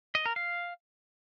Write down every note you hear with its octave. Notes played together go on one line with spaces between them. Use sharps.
D#5
A#4
F5